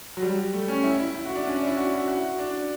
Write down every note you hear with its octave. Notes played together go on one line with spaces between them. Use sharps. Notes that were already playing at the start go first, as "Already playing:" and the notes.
F#3
G3
A3
C#4
E4
E4
E4
F#4
D4
C#4
D4
E4
F#4
E4
F#4
D4